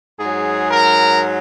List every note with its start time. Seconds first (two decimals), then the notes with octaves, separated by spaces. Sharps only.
0.19 G#2 F#3 G#4
0.71 A#4